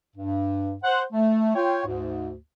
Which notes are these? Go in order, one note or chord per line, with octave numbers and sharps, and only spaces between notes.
G2
C5 F#5
A3
F4 C#5 G5
D2 G#2